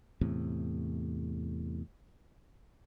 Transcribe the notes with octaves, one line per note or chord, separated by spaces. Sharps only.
E2 A2 C3